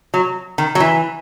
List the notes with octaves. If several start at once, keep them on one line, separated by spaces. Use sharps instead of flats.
F#3
D#3
F#3
E3